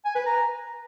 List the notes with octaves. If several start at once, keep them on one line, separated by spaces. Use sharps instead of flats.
G#5
B4
A#5